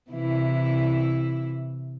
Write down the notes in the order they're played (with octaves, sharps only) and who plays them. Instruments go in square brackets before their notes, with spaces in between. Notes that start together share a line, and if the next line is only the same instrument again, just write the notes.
[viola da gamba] C3 E3 E4